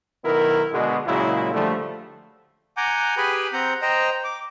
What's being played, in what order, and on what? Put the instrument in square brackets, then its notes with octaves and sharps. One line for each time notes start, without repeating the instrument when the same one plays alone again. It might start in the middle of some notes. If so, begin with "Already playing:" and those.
[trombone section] B1 D#3 B3 E4 A#4
B2 D3 G#3
A#2 C#3 F#3 G#3 A#3 E4
D3 F3 G3 A3
[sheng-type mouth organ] F#5 G#5 A#5 D6 G6
G4 G#4 B4 G5 G#5 B5
C4 F#5 A#5 G6
C5 D#5 G5 A#5
D6